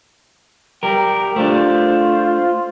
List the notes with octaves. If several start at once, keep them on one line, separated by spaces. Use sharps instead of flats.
G3 A#4 G5
A3 D4 F4 C5